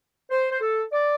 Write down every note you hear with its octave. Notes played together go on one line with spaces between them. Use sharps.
C5
C5
A4
D5